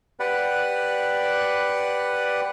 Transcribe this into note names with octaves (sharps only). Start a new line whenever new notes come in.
G4 B4 D5 F#5